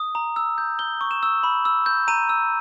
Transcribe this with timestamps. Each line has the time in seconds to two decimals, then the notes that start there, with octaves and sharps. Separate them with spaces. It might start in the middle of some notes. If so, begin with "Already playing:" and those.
Already playing: D#6
0.15 A#5
0.36 E6
0.58 G6
0.79 G6 G7
1.01 C#6
1.11 E7
1.23 E6
1.43 B5
1.65 E6
1.86 G6
2.08 A#5 D#7
2.29 E6